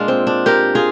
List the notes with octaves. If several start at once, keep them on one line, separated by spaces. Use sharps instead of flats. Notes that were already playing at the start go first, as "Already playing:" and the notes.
Already playing: A#2 G#3 D4 F4
C4
D4
G4 A#4
F4 G#4